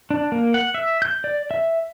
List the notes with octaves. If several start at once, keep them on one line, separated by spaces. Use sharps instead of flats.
D4
A#3
F#5
E5
G6
D5
E5